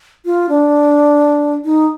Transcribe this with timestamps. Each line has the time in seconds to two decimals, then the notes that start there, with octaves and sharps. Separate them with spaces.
0.26 F4
0.49 D4
1.65 D#4